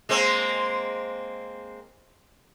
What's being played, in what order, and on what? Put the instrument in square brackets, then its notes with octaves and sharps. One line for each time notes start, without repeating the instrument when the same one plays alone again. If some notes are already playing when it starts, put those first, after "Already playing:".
[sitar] G#3 A#3 C4